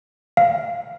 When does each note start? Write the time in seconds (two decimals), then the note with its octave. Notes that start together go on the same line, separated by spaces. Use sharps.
0.37 F5